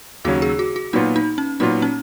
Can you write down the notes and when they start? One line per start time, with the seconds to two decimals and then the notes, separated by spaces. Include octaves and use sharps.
0.25 D#2 C#3 F#3 C#4 F#4
0.42 G#4
0.59 F#4
0.76 F#4
0.93 A#2 F#3 B3 D#4 F4
1.16 D#4
1.38 C#4
1.60 A#2 F#3 B3 D#4 F4
1.82 C#4